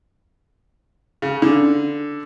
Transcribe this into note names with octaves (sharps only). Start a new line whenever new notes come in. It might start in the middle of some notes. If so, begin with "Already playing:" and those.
C#3
D3